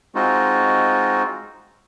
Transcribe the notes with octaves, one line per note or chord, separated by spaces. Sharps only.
G#3 C4 D#4 F4 F#4